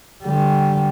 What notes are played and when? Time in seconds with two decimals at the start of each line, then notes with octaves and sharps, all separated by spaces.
0.23 D3 G3